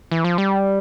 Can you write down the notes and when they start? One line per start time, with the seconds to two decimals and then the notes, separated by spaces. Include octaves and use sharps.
0.11 E3
0.24 F3
0.38 G3